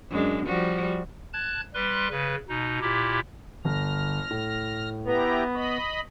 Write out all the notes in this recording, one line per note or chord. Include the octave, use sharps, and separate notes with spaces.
F#2 G#3 D4
F3 G3 F#4
A5 F#6 G#6
G3 B4 C6 F#6
C#3 B4
B2 D#4
A#2 E4 G4
G1 F6 A#6
A2
B3 E4 G4 A#5
D#5 B5 C#6